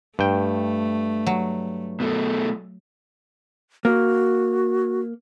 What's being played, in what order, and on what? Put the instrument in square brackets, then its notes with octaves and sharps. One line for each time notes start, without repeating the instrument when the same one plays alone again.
[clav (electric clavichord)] G2 G5 [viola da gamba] A3
[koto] F#3
[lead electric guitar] B2 A3
[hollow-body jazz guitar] A#3 [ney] F#4